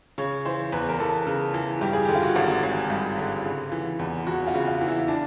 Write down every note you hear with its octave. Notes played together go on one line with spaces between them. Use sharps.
C#3 C#5
E3 C5
E2 B4
A#4
E2 A4
C#3
E3
G2 G4
G#4
D3 G4
F4
F#4
G#1
G#1
G2
D3
C#3
E3
E2
E2 F#4
F4
C#3
F4
E3
E4
D4